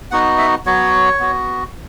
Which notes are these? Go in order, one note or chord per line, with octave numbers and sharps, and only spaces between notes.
B3 D#4 F#4 F#5
E5
F#3 B3 F#4 C#5
B3 F#4